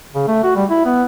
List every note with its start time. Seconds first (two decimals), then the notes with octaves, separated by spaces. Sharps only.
0.15 C#3
0.28 A3
0.44 F#4
0.56 G3
0.70 E4
0.86 B3